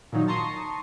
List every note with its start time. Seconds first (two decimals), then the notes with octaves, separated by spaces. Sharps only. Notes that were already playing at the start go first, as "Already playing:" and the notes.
0.12 A#2 D#3 F#3 D#4
0.28 A5 A#5 C6 C#6 D#6